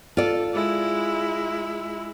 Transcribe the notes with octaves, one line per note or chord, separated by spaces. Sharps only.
F4 A4 D5
G#3 E4